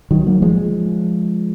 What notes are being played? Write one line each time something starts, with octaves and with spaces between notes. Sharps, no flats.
D#3 F#3
F#3 A#3
F3 G#3